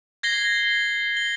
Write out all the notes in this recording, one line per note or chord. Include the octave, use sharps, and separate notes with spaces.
G#6 A#6 C7 G7
G7